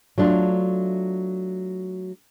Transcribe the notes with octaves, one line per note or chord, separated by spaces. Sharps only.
F#3 A3 D4 F4